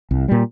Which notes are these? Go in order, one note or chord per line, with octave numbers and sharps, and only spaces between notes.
C2
A#2 G3